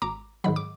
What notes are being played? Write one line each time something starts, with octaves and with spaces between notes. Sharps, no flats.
G#1 A#5 D6
G#2 D#3 F#3 B5
D6